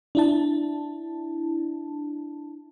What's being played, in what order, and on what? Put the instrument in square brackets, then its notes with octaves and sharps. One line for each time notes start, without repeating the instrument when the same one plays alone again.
[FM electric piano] D4 E4 A5